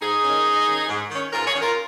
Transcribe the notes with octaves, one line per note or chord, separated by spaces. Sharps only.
G#2 D#4 G#4
D#3 C#4
G#2
D#3 C#4
G#2
D#3 C#4
G#2 F4 A#4
G#4 C#5
D#3 C#4
F4 A#4